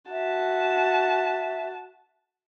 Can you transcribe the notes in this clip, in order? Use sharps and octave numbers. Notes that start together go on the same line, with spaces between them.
F#4 E5 A5